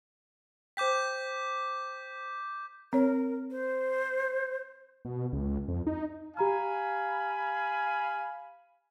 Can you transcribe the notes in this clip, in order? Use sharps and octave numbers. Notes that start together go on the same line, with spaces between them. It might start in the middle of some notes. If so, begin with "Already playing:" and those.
C5 G5 D6 G6 B6
C4 A#4 C#5
C5
B2
C#2
F2
D#4
G4 F5 G#5 A#5 B5 F6